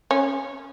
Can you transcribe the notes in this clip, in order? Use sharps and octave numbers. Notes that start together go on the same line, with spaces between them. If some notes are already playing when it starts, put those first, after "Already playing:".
C#4